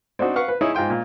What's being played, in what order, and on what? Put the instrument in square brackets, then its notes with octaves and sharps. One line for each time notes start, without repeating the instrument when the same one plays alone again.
[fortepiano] C4 D4 D#4 F#4
B4 F5 F#5 C#6
B4
D#4 E4 G#4 C#5
G#2 F4 G5 C6
A#2